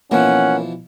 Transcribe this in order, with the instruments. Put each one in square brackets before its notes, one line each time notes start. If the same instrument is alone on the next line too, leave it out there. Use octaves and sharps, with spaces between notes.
[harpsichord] B2 E3 F3 [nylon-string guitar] A#3 B3 [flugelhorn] C#4 [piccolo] F#5